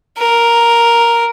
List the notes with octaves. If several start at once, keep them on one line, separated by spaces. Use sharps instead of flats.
A#4